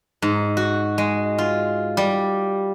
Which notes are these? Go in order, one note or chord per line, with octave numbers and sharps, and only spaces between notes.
G#2
F#4
G#3
F4
G3